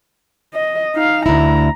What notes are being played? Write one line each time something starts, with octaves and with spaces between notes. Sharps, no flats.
D#5
D#4 F5
D2 E4 A#5